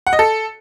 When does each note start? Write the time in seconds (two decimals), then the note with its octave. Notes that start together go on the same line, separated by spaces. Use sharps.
0.07 F#5
0.13 D#5
0.19 A4